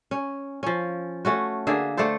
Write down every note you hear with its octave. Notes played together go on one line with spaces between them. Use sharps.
C#4
F3 C#4
A3 C#4 F#4
D3 A#3 G#4 E5
A3 D4 A4 C5